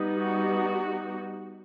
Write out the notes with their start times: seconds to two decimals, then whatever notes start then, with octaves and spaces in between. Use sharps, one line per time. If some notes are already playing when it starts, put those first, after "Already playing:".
Already playing: G3 B3 D#4
0.20 F#4